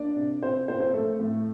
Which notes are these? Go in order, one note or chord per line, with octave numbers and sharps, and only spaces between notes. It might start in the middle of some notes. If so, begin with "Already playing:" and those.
Already playing: A#3 D4 D5
C3
C3 C4 C5
A#3 C4 C5
C4 C5
A3 C4 A4
A2